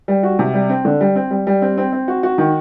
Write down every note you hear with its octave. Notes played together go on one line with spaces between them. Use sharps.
G3
F#4
C3
G3
C4
D3
G3
C4
G3
G3
C4
C4
C4
F#4
F#4
D#3